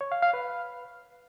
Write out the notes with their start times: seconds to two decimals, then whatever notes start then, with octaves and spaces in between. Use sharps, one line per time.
0.01 C#5
0.12 F5
0.23 F5
0.33 B4